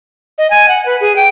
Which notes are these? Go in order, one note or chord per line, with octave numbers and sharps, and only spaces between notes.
D#5
G#5
F#5
B4
G#4
G5